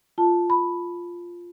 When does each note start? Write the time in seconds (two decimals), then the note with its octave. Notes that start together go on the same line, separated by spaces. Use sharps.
0.18 F4 A5
0.50 B5